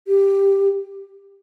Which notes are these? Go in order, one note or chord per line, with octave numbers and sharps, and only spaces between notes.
G4